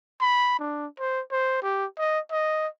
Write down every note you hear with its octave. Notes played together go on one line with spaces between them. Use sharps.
B5
D4
C5
C5
G4
D#5
D#5